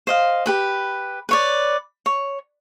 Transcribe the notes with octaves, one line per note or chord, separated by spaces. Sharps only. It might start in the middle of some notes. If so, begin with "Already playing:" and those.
C5 D#5 F5
G4 B4 B5
B4 C#5 D5
C#5